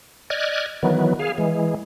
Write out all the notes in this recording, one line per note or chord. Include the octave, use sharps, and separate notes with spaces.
D5 D#5 F6 F#6 G#6
D#3 E3 F#3 B3
G#4 F5
E3 G#3